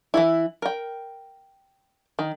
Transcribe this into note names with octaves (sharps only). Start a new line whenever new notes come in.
E3 F3 E4
A#4 G5
D#3